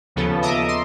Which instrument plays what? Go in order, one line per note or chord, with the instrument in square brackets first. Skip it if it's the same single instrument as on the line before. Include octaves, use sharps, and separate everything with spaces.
[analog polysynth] D#2 C#3 F3 B3 A4
D#5 E5 A#5 D6 D#6
C6